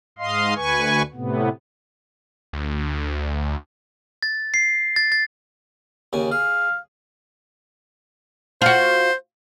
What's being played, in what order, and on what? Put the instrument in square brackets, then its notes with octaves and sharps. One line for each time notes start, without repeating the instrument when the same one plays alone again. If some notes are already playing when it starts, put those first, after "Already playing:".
[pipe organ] G#2 D#5 F5 C6
D2 B4 G#5 C#6
A2 C3 B3
[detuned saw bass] D2
[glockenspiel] A6
C7
A6
A6
[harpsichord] D#2 C#3 G#5
[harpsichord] G#4 [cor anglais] F5
[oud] F4 F#4 [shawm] C5